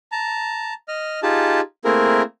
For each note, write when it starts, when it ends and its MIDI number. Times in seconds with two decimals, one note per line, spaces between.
0.12 0.74 81
0.12 0.74 82
0.88 1.20 75
0.88 1.20 89
1.23 1.60 63
1.23 1.60 65
1.23 1.60 67
1.23 1.60 68
1.23 1.60 81
1.85 2.22 57
1.85 2.22 58
1.85 2.22 60
1.85 2.22 64
1.85 2.22 68
1.85 2.22 70